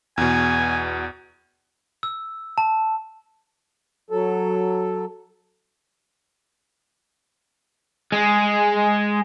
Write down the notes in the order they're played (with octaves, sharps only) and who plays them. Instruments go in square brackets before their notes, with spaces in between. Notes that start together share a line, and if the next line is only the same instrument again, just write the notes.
[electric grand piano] E2 B2 [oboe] G#5
[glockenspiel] E6
A5
[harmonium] F#3 A4
[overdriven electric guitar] G#3